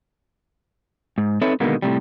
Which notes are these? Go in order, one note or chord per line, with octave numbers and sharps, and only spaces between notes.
G#2
C4 D#4 A4 B4 C#5 E5
B2 D3 D#3 G#3 A#3 B3
A2 C3 G3